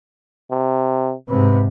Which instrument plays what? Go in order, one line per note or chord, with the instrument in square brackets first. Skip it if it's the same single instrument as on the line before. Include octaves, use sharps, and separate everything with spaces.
[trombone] C3
[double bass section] G#2 C3 [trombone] B4